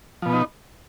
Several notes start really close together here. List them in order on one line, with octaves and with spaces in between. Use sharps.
F3 B2 B3 D#4